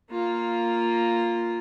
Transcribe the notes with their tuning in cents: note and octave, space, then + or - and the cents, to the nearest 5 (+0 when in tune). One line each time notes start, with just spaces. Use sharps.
A#3 -5 F4 +0